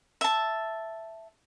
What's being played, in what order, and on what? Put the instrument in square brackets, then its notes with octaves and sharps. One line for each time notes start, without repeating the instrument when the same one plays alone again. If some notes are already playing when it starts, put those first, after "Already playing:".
[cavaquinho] E5 A5